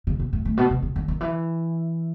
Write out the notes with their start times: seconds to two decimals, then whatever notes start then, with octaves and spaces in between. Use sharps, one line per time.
0.07 C#3
0.20 B2
0.33 A2
0.45 A2
0.57 B2
0.70 C3
0.83 C#3
0.96 D3
1.08 D#3
1.21 E3